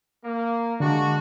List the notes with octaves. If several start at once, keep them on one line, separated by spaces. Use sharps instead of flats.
A#3
D3 G#3 D4 F#4